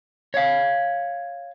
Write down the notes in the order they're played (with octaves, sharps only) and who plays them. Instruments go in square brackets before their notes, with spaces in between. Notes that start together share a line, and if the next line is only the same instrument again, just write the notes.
[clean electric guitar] C#5 F5